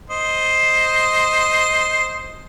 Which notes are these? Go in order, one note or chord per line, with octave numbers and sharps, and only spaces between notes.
C5 D#5